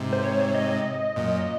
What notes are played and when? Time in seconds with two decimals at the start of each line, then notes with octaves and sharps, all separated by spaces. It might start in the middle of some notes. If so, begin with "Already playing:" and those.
Already playing: G#2 C3
0.13 C5
0.24 C#5
0.55 D#5
1.16 F#2 A#2